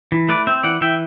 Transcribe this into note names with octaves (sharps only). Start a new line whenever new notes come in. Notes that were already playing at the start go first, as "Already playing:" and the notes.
E3
A3 B4 D5
C4 C5 E5
E3 D5 F#5
E3 E5 G5